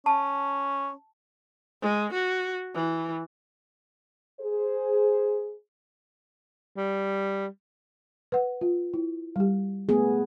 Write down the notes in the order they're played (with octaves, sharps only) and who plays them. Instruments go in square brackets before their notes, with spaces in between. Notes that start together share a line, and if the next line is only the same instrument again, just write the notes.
[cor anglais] C#4 [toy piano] A5
[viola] G#3
F#4
E3
[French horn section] G#4 C5
[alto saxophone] G3
[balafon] B4 F#5
F4
E4
G3 G4
[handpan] A3 B3 G#4